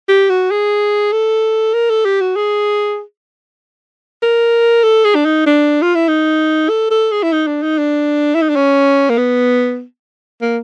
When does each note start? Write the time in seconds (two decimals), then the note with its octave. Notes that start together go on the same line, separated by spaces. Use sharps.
0.09 G4
0.29 F#4
0.51 G#4
1.12 A4
1.74 A#4
1.90 A4
2.05 G4
2.21 F#4
2.36 G#4
4.23 A#4
4.84 A4
5.04 G#4
5.15 D4
5.25 D#4
5.46 D4
5.82 F4
5.95 E4
6.08 D#4
6.70 A4
6.91 A4
7.11 G#4
7.23 E4
7.32 D#4
7.47 D4
7.63 D#4
7.78 D4
8.35 E4
8.42 D#4
8.49 D4
8.56 C#4
9.09 A#3
9.18 B3
10.42 A#3